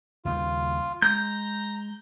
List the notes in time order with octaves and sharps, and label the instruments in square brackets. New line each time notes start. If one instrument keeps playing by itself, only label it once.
[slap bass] D#2 C#3 G3 [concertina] F4
[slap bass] G#3 [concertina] A#5 [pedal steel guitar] G6